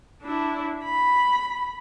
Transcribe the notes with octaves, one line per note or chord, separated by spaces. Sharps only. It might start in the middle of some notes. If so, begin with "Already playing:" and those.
D4 E4
B5